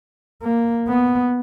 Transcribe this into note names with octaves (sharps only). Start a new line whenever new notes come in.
A#3
B3